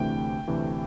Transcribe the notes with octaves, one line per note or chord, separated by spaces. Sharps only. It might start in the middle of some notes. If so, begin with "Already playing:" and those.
Already playing: D2 C3 E3 A3 D4 G5
D2 C3 E3 A3 D4